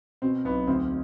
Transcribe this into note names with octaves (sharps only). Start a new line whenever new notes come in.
B2 C4
B1 B3
D2 C4